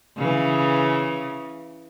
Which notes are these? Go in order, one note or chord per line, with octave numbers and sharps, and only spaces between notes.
C#3 E3